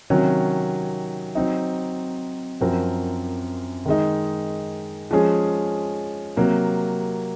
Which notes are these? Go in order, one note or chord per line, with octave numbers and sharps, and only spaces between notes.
C3 D#3 F#3 C#4
F#3 C4 D#4
F#2 F3 C4 F#4 A#4
D#3 G#3 D#4
F3 G#3 C#4 G#4
C3 F#3 A#3